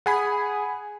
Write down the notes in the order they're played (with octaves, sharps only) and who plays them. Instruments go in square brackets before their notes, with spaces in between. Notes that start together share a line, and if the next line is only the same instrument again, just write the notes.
[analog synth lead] G#4 [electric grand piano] F#5 G#5 B5